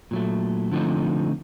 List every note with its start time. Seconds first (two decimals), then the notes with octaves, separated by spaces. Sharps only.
0.11 A#2 F#3 A3
0.71 D3 F3 A3 C4 D#4